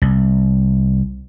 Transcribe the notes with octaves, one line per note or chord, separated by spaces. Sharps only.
C2